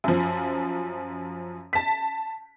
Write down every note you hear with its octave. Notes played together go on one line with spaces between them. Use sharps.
F#2 F3
A5 B6